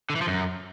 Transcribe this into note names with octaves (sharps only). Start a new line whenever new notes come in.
D3
E3
F3
F#2